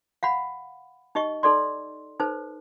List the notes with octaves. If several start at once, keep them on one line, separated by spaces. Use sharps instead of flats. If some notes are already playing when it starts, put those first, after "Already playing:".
F5 F#5 B5
D#4 G4 D#5 C#6
D#4 A4 D5 C6
D#4 A4 B4 C5